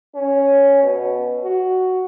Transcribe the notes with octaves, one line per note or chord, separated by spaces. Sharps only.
C#4
B2
F#4